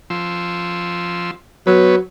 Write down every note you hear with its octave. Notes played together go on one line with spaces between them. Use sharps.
F3 C6 E6
F#3 B3 B4 C#5